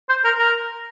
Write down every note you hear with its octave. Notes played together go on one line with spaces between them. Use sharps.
C5
A#4
A#4